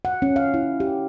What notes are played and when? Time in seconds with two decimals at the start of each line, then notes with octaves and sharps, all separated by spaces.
0.05 F#5
0.22 C#4
0.36 F5
0.54 E4
0.80 G4